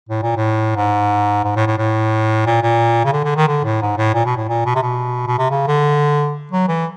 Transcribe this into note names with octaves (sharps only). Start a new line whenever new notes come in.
A2
A#2
A2
G#2
G#2
A2
A2
A2
A#2
A#2
C#3
D3
D3
D#3
D3
A2
G#2
A2
A#2
B2
A2
A#2
B2
C3
B2
B2
C3
C#3
D3
F#3
E3